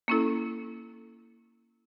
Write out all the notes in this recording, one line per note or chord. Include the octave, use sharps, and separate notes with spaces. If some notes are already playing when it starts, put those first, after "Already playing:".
A#3 C#4 E4 A4